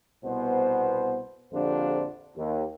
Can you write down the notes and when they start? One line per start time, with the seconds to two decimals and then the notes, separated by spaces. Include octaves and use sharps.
0.25 C2 B2 B3 C5
1.53 A#1 F2 D3 D4 G4 C5
2.37 D#2